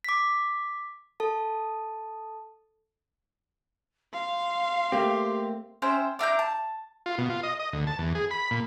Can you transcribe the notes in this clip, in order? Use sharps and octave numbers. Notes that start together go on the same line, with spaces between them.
D6 B6
A4 A5
F5 C6
A3 A#3 C4 G4
C#4 E4 C5 G5
D4 E4 A#5 G6
A5
F4
B2
F4
D#5
D#5
D2
A5
E2
G#4
B5
A#2